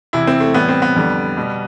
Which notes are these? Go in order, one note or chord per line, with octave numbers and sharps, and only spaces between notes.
E2 C3 E3 E4
C4
A3
A2 E3 G3 B3
C4
B3
F2 D3 G3
B2 G3